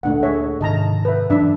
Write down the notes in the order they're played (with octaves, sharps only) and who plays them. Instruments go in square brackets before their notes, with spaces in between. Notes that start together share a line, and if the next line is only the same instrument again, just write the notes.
[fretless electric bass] D2 A#2 [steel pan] A3 D4 F#5
[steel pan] G#4 C#5 E5
[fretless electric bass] G#2 C3 D#3 [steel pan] D#5 A5 A#5
[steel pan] B4 E5
[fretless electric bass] G2 E3 F#3 [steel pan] D4 E5